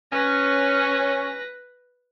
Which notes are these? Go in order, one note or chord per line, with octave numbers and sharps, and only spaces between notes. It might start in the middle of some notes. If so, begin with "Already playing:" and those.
C#4 B4 A#6